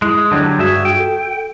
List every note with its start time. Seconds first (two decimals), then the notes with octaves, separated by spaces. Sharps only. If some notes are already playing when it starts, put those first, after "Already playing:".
0.02 G#3 E4
0.31 D3 F#3 G3 D4
0.58 G2 F#4 G#4 E5
0.85 G5
0.98 A4